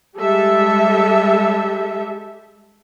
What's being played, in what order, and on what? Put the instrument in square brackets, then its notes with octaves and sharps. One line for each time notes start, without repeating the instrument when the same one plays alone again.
[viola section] G3 G#3 G4 A4 E5